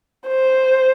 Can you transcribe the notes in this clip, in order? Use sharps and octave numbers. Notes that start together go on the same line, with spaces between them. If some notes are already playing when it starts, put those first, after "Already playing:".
C5